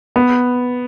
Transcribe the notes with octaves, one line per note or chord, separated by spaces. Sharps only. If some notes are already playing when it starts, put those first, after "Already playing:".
B3